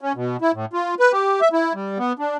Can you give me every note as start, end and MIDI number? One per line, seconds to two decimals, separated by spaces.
0.01 0.13 61
0.16 0.37 47
0.42 0.52 64
0.54 0.65 45
0.73 0.95 65
1.00 1.12 71
1.12 1.41 67
1.41 1.49 76
1.53 1.73 64
1.74 1.98 55
1.98 2.13 59
2.19 2.37 62